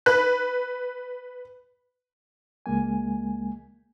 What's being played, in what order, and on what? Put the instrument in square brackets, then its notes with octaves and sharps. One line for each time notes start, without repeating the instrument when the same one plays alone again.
[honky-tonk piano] B4 F#6
[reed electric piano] C#2 G#3 A#3 G#5